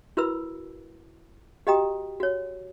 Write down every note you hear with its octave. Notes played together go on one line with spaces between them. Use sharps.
E4 F#4 A#4 B4 B5 E6
F#4 G4 D#5 G5 A#5 D#6
F#4 C#5